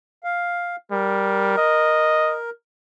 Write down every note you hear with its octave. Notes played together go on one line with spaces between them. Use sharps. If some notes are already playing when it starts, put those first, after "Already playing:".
F5
G3 A#4
D#5